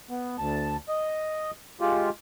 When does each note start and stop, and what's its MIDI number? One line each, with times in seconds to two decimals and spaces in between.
0.10 0.36 59
0.39 0.76 38
0.39 0.76 81
0.88 1.51 75
1.81 2.10 56
1.81 2.10 65
1.81 2.10 67